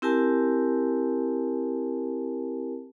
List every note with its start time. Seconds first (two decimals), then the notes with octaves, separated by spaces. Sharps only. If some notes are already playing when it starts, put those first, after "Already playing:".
0.02 C4 E4 G4 A#4 G#5 A5